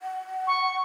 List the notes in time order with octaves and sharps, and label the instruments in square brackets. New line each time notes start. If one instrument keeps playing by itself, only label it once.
[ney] F#5
[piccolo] C#6